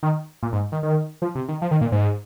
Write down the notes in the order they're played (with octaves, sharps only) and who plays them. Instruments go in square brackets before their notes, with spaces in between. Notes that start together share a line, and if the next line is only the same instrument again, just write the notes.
[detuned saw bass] D#3
A#2
G#2
D#3
D#3
F3
C3
D#3
F3
D#3
A#2
G#2